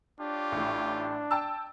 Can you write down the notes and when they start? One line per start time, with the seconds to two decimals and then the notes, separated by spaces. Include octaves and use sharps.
0.20 D4 F4 G4 C#5
0.52 A1 A2
1.31 G5 A5 E6